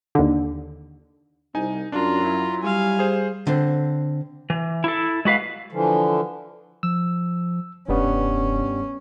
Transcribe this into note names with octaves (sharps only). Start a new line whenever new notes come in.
D#2 D3
C2 D#4 G#5
F#2 D4 F4 A#5
F#3 E4
G3 F5 G#5
G#4 C5
D3 C4
E3
E4 A4
G#3 F#4 B4 F5
D3 E3 F3
F3 E6
F1 G2 G3 B3 C#4